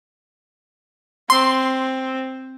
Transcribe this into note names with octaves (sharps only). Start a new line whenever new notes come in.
C4 C6